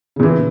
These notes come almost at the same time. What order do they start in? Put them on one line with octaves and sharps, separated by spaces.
C#3 A#2 E3